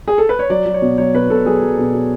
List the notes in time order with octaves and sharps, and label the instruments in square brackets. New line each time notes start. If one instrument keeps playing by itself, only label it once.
[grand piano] G#4
A4
B4
C#5
F#3 D5
F#3
C#5
B2
F#3 C#5
B2 B4
B2 A4
F#3 G#4
F#3
B2
B2